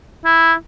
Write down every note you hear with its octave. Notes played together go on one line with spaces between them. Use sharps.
E4